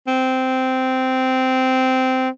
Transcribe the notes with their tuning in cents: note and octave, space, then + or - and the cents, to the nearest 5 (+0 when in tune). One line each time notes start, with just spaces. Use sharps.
C4 -10